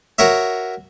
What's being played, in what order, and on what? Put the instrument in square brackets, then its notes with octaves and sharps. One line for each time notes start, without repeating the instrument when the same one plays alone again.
[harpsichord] F#4 A#4 C#5 E5